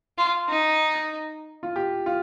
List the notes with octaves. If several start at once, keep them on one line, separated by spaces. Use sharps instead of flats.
F4
D#4
F4
G4
F4